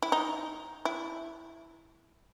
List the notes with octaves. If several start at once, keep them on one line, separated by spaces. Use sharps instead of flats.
E4
D#4
E4